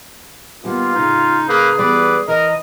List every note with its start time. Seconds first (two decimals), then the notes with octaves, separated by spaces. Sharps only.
0.64 D#2 G3 A#3 B3 F4
0.95 A2 C#3 D#4
1.49 A#3 G#4 B4
1.79 E3 G3 B3 B4 D5
2.28 E3 A#4 D#5